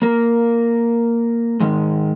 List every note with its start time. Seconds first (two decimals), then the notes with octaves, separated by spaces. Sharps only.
0.02 A#3 A#4
1.60 G#2 D#3 G#3